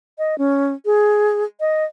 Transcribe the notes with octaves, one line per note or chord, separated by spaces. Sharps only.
D#5
C#4
G#4
D#5